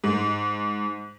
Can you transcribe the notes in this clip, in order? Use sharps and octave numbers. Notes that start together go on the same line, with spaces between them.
G#2